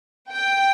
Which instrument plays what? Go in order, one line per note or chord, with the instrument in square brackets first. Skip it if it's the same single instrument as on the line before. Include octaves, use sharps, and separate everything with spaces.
[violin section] G5